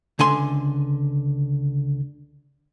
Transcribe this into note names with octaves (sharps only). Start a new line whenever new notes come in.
C#2 D3 G#5 C6